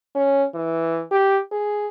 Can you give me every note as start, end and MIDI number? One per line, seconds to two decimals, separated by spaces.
0.15 0.45 61
0.54 1.02 52
1.11 1.40 67
1.52 1.88 68